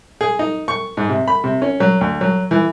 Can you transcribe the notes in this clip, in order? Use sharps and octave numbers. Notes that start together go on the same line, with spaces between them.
G#4
D#4
C#6
G#2
C3
B5
C3
C#4
F#3
D2
F#3
E3